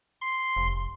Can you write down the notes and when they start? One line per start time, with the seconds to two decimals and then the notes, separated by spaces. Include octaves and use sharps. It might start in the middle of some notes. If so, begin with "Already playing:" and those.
0.21 C6
0.56 F1